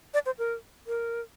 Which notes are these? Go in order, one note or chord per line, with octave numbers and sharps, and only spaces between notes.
D5
C5
A#4
A#4